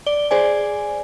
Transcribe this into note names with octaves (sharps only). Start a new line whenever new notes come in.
D5 G7
G#4 C5 D5 G#5